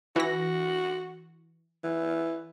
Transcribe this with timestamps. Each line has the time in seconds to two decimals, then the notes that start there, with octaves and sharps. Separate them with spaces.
0.16 E3 F#4 A#6
1.84 E3